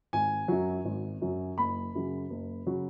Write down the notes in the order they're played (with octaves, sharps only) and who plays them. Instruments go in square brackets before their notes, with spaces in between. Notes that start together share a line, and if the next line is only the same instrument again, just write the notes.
[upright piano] G#1 G#5
F#2 F#3
G#1
F#2 F#3
F#1 B5
F#2 C#3 F#3
F#1
C#3 F#3